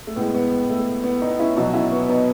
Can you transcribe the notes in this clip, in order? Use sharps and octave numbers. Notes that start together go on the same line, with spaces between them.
A3
A2 G#3 B3
B3
A3
B3
B3 D#4
C#4 E4
B2 F#3 D#4 F#4
C#4 E4
B3
B3 D#4